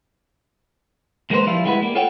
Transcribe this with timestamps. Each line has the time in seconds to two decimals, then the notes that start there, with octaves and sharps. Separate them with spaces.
1.30 E2 G#3 A#3 B3 B4 C5
1.47 F3 G3 E4 F4
1.65 G3 G#3 B3 E4 F#4 B4
1.82 G3 A#3
1.95 F4 A4 C#5 F#5 G5